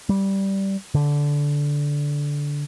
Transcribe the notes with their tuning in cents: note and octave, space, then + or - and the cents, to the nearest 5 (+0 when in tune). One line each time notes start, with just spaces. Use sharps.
G3 -10
D3 -10